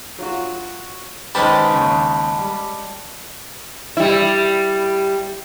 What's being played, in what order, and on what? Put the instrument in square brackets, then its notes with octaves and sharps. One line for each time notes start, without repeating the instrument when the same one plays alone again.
[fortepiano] F#3 F4 F#4
[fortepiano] D#3 B4 C5 [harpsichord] G#3 C#4 G4 [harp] A5 [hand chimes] B5
[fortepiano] D#2 C#3
G3
[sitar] G3 E4